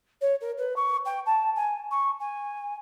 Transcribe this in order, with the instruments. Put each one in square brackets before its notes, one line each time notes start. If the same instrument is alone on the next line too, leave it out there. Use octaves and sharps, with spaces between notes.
[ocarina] C#5
A#4
B4
C#6
G5
A5
G#5
C#6
G#5